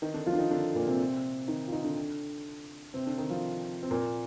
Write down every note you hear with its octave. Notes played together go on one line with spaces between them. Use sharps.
D#3 D#4
D3 D4
F3 F4
D4
D#3 D#4
D3 D4
A#2 A#3
C3 C4
D#3 D#4
F4
D#3 D#4
D3 D4
C3 C4
D3 D4
D#3 D#4
F3 F4
C4
A#2 A#3